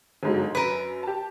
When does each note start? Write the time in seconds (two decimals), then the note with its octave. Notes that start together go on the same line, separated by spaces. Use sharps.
0.23 G1 G#2 F#3
0.55 F#2 A#4 B4
1.03 G4 A5